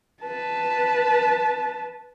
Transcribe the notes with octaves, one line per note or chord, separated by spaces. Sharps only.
B4 A5